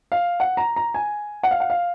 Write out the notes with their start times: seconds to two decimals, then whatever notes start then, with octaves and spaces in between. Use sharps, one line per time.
0.12 F5
0.40 F#5
0.57 A#5
0.76 A#5
0.94 G#5
1.43 F#5
1.51 F5
1.60 F#5
1.70 F5